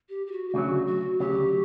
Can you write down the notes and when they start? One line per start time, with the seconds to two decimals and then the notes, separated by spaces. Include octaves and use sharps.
0.09 G4
0.27 G4
0.32 F#4
0.49 G4
0.54 D2 C#3 F#3 F#4
0.87 F#4
1.19 D2 C#3 F#3 G4